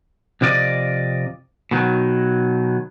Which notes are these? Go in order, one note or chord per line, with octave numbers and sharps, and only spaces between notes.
F2 C3 F4 D5 D#5
B2 D#3 F#3